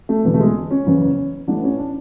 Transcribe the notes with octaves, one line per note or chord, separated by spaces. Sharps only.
A3
E1 E2 D3 B3
A3
G#3
C#4
F#1 E2 C#3 E3
A1 A2 E3 D4
C#4
D4